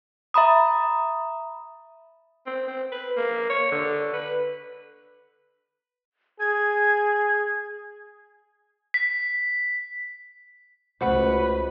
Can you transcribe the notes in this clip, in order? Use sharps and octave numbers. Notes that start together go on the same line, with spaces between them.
E5 A#5 B5 D#6
C4
C4
B4
A#3
C#5
D3
B4
G#4 G#6
B6
C#2 A3 F#4 B4 C5 F#5